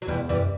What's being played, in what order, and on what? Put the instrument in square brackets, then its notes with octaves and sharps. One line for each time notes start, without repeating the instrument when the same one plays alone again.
[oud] F#3
[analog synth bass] E2 [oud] E3 G3
[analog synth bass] F#2 [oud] E3 G3